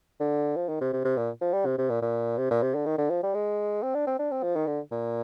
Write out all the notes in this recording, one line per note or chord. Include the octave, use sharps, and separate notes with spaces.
D3
F3
D#3
C3
C3
C3
A#2
F3
G3
C3
C3
A#2
A#2
C3
A#2
C3
D3
D#3
D3
F3
G3
G#3
C4
D4
C4
D4
C4
F3
D#3
D3
A#2